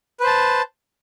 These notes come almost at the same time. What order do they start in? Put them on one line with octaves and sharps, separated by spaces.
B4 C5 A5